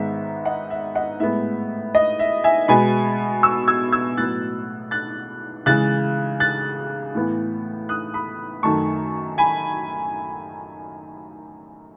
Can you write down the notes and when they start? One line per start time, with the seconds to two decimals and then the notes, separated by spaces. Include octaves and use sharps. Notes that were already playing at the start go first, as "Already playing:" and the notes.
Already playing: G#2 D#3 G#3 B3 E5
0.45 D#5 F#5
0.70 E5
0.95 D#5 F#5
1.20 A2 G#3 B3 E5
1.95 D#5
2.19 E5
2.44 E5 G#5
2.68 B2 G#3 B3 G#5 B5
3.43 C#6 E6
3.68 E6 G#6
3.92 E6 G#6
4.17 A2 F#3 B3 F#6 A6
4.91 F#6 A6
5.66 C#3 E3 G#3 F#6 A6
6.40 F#6 A6
7.15 A2 E3 B3
7.89 D#6 F#6
8.14 B5 D#6
8.63 F#2 D#3 A3 A5 C#6
9.38 G#5 B5